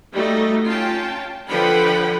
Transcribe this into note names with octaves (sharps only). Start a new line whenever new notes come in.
G3 A3 D#4 F#4
C#4 F4 G5 A5
D3 F3 B4 F#5 G5 B5